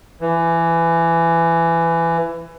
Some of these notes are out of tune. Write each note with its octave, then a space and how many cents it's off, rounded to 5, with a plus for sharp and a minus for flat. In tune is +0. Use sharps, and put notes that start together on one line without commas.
E3 +20